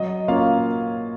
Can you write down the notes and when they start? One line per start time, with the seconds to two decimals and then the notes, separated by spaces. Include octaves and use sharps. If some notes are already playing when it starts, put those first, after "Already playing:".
Already playing: F#3 D#5
0.28 A#3 C#4 F4 F5